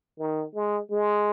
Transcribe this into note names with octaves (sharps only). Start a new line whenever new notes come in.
D#3
G#3
G#3